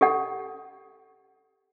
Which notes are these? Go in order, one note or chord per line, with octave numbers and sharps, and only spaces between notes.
G4 A4 F#5